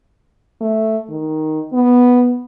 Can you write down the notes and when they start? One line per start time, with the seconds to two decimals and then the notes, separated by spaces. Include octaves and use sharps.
0.61 A3
1.09 D#3
1.73 B3